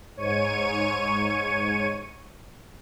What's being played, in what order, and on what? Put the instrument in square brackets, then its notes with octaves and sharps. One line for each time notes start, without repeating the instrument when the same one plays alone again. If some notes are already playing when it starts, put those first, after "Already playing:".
[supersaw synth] G#2 C#5 C#6 D#7